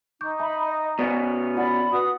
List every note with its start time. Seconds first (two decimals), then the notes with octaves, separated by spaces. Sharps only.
0.21 D#4 C#6 D6 G6
0.40 E5 A5 B5
0.65 D#5
0.99 B2 B3 C#4 D5
1.55 E4 F4 D5 F#5 B5
1.92 F#4 B4 D#6